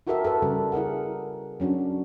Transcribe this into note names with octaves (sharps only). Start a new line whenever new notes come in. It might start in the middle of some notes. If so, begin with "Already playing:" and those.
E4 F#4 G4 A4 A#4 E5
A4 B4
C#3 G3 A4
E4 G#4 A#4 F#5
F#3 C#4 D4 F#4